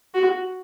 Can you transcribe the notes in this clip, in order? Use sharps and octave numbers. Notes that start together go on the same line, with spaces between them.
F#4